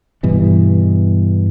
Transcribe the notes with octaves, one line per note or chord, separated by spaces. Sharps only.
G2 B2 E3